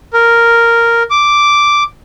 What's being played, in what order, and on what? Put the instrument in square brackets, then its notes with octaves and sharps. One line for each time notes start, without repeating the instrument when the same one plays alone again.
[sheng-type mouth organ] A#4
D6